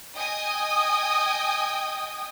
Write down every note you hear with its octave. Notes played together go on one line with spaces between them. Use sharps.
D#5 G5 G#5 D#6